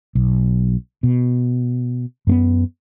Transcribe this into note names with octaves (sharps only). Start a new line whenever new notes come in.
B1
B2
F#2 A3 B3